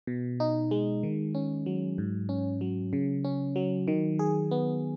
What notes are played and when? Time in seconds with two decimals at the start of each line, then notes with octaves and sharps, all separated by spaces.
0.07 B2
0.40 D#4
0.71 G#3
1.03 D#3
1.35 C#4
1.66 F#3
1.98 G#2
2.29 C#4
2.61 F#3
2.93 C#3
3.24 C#4
3.56 F#3
3.88 D#3
4.19 G#4
4.51 B3